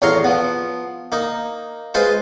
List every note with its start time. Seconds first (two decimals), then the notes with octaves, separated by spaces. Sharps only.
0.02 A1 E2 C#5 F5 A#5 C6
0.24 F3 B3
1.12 A#3 D#4
1.94 G#3 F4 B4 C5